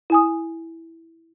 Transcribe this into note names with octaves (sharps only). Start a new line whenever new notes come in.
E4 G#5 D#6